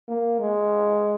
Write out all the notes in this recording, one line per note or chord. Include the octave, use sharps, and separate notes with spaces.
A#3
G#3